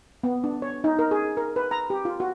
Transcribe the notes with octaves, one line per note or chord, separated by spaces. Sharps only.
B3
D4
C#5
D#4
A#4
G#4
A#4
B4
A#5
G4
F4
F#4